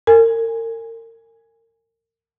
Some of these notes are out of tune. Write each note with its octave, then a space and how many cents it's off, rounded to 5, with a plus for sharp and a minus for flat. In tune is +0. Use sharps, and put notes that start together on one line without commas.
A#4 -35 G#5 -10